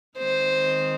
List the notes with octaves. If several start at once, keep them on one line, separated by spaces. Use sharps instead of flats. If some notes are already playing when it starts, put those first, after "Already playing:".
D#3 G#3 C4 D#4 C5